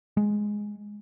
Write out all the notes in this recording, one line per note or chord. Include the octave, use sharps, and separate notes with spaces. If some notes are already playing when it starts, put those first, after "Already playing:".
G#3